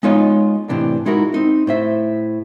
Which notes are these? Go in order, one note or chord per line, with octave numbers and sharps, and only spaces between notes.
G#3 B3 D#4 F4 C#5 D#5
A2 C3 E3 D4
G#3 D#4 E4 F#4 A#4
C4 D#4
A2 C5 E5